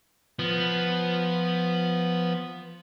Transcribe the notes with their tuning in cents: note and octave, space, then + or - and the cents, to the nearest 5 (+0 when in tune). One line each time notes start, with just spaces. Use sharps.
F3 +0 B3 +0